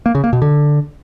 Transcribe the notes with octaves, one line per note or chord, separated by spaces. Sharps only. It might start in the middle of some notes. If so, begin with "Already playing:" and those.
A#3
C#3
A#3
B2
D3